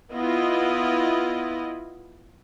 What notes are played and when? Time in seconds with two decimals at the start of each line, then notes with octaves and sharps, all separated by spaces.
0.11 B3 E4 F4 D#5